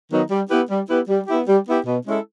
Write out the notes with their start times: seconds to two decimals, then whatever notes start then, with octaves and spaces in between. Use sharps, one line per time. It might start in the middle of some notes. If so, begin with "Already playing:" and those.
0.11 D#3 F#3 B3 D#4
0.31 G3
0.50 B3 E4 G4 B4
0.70 G3
0.89 B3 E4 G4 B4
1.09 G3
1.28 B3 E4 G4
1.48 G3
1.67 B3 E4 G4
1.87 B2
2.06 G#3 C#4 E4 A4